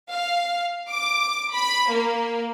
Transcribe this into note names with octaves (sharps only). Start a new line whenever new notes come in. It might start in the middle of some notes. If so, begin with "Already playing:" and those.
F5
D6
B5
A#3